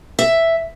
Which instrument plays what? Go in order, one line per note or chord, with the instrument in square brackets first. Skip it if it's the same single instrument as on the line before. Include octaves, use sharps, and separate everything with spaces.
[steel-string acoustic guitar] E5